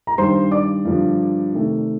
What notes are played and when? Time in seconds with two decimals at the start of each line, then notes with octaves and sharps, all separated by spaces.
0.07 A#5
0.18 G2 D#3 G3 C5 C6
0.51 D5 D6
0.85 G2 D3 F3
1.53 C3 D#3 A3